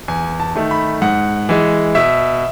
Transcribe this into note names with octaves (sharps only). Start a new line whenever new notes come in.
E2 G#5
A5
D#3 A3
B5
G#2 F#5
E3 G#3
B2 E5